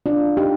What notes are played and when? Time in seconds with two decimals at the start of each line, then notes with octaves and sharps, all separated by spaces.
0.06 D4 F4
0.37 D#4 G4